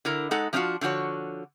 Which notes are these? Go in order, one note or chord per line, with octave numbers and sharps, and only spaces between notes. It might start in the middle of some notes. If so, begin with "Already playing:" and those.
D3 E4 A#4
G#3 D#4 A4 F#5
F3 A#3 C4 D4 F4 F#4
D3 F3 D4 F#4 C#5